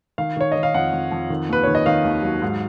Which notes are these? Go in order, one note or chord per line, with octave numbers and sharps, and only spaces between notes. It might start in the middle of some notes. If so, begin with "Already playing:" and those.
D#3 F5
D#3 C#5
D#3 D#5
F5
F2 F#5
F2
F2
D#3
D#2 B4
D#3 C#5
D#5
D#3 F5
D#2
F#3
G#2